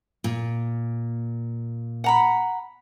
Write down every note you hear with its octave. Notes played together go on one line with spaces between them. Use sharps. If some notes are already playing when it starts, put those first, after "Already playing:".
A#2
F#5 A#5 B5